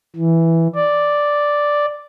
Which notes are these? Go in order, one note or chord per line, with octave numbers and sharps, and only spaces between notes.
E3
D5